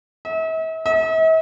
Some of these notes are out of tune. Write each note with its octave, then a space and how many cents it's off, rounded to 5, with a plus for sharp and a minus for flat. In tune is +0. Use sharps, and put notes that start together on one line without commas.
E5 -40
E5 -45